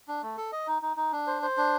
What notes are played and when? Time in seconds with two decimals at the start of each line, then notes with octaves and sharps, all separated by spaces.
0.08 D4
0.23 A3
0.37 A4
0.52 D#5
0.67 D#4
0.82 D#4
0.97 D#4
1.12 D4
1.27 C5
1.42 C5
1.57 D4